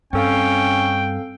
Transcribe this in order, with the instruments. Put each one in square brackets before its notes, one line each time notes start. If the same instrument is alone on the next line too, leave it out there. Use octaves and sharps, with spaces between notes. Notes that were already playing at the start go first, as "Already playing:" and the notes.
[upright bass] G2 [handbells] C4 A4 F5 [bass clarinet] C#4 [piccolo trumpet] G5